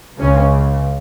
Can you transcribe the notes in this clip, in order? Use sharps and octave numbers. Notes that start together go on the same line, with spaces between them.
C#2 C#3 C#4